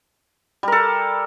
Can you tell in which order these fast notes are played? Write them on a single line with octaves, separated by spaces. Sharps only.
G3 A#4 A4